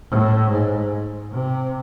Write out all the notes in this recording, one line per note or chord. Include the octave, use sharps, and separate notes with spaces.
A2
G#2
C3